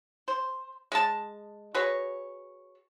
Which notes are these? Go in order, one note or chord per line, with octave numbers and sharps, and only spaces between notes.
C5
G#3 A5
F#4 G#4 B4 C#5